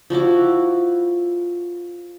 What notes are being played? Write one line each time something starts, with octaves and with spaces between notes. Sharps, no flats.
F3 E4 F#4 D6